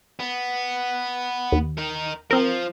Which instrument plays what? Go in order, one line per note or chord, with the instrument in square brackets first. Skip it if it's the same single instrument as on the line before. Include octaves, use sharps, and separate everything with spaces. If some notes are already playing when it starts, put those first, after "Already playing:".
[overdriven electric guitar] B3
[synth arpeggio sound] D#2
[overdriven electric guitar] D#4 A#4
[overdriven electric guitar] F3 [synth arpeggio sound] C4 A#4